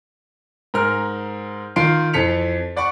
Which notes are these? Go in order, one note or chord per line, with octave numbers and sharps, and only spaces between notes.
G#2 A#4 F6
D#3 F4 C6 C7 D7
F2 E3 A4 B6 C#7 F7
D5 F#5 B5 C#6